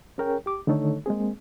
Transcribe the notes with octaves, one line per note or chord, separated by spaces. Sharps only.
C#4 G#4 A#4 C#5 G5
G4 D6
D3 D#3 A3 D#4 A4 C#5
G#3 A#3 C4 G#4